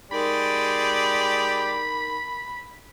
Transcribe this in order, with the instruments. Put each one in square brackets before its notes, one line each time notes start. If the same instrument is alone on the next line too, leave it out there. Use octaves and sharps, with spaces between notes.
[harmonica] G#3 G4 D5 [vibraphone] D#4 A#4 [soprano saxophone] B5